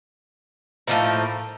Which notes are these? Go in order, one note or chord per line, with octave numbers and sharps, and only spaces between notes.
A2 F3 A#3 D#4